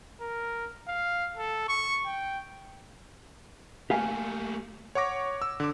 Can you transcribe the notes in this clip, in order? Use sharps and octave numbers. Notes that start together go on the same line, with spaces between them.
A#4
F5
A4
C#6
G5
A3 A#3 G4 F5 G#5
C#5 F#5 C#6 D6 A#6
E6
D3 D6